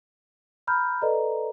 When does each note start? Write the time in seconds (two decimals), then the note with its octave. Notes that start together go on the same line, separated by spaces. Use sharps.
0.67 A#5 B5 F6 G6
1.02 A4 B4 D5 D#5 A#5